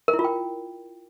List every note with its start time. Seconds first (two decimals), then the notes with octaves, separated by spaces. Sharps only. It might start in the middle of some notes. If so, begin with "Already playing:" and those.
0.08 A#4
0.14 E4
0.19 F4
0.24 G5